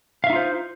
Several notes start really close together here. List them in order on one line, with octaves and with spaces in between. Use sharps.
F5 E5 D#4 F4 C5